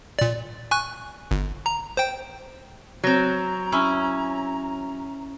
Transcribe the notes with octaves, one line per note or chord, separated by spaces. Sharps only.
A#2 D5
G#5 C#6 F#6
G1
A#5
C5 G5
F#3 C4 A#5
C#4 E4